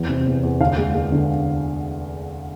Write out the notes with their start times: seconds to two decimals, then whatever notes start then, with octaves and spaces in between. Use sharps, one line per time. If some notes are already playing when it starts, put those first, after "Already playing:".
Already playing: E2 E3
0.09 C3
0.26 E2
0.43 E2
0.61 D2 F5
0.78 G#3
0.95 G#3
1.12 D3